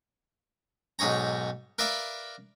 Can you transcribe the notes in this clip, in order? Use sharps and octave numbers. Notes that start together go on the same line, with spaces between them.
B1 G#2 G#4 C#5 A#5
A#4 B4 D5 E5 F5 B5